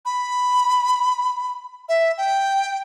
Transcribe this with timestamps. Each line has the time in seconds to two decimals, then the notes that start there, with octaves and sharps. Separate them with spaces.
0.05 B5
1.89 E5
2.18 G5